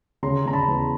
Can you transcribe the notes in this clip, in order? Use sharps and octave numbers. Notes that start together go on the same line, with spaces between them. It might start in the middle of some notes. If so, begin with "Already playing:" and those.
C#3 A#5 C6
C#3 A#5
A5 B5
E2